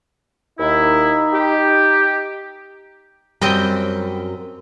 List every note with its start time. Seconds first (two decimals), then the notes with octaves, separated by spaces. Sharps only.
0.59 D#2 D#4 E4
1.33 G4
3.42 F#2 G3 C4 D#5 G5